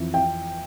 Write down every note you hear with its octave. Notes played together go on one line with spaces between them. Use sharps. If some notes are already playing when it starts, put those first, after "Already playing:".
Already playing: F2 E3
G5